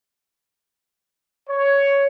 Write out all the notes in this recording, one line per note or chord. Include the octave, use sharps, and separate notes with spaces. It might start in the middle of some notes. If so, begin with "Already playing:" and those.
C#5